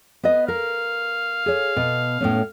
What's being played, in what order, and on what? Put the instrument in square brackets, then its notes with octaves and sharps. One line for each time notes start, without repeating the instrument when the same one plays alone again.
[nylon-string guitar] B3 B4 D#5
[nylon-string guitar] A#4 [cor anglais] F5
[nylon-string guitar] G#4 C#5
B2
A2 B3 C#4